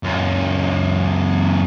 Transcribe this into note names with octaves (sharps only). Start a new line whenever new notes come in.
C#2 F#2